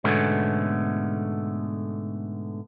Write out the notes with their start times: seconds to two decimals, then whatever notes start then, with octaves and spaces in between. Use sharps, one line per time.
0.04 G#2 B2 D3 A3 B3 C#4